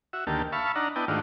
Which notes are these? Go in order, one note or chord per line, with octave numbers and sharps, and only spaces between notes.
F#4 E5
D2 D#3 A#3 G4 A5
E5 F5 A5 B5 C#6
D4 D#4 F#5 A#5
B3 D4 E4 D#5 G5 A5
G#2 D#3 A3 D4 F4 F#4